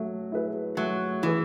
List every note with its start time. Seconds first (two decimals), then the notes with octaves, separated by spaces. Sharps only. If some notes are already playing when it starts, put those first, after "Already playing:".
Already playing: F#3 A3
0.32 E4 G#4 B4
0.77 F#3 A3
1.23 E3 E4 G#4 B4